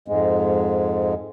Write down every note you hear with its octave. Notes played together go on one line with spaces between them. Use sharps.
F2 G#2 G#3